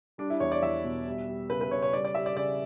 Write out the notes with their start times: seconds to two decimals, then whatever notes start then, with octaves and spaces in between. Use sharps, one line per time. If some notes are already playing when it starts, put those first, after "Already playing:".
0.18 G3 D4
0.30 E4
0.40 E2 C#5
0.52 D5
0.62 E2 E5
0.84 B2
1.06 G3
1.28 G3
1.49 C#3 B4
1.61 B4
1.71 C#3 C#5
1.82 C#5
1.92 G3 D5
2.05 D5
2.15 G3 E5
2.26 D5
2.36 C#3 D5